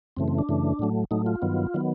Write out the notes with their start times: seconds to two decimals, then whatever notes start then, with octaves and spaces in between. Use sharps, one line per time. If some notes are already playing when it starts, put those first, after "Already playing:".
0.17 F#2 C#3 E3 A3 C4
0.28 C4
0.38 D4
0.49 F#2 C#3 E3 A3
0.79 A2 F#3 A3
1.11 A2 F#3 A3 D#4
1.26 F4
1.42 G2 D#3 F#3 B3
1.74 D#3 F#3 B3